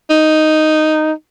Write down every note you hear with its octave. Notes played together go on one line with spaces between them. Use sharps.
D#4